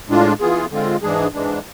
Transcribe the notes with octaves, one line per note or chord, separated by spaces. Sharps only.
A2 G#3 D4 F4
E3 B3 F4 G#4
D3 G#3 C4 F4
G#2 E3 G#3 D4 G#4
G#2 E3 G#3 D4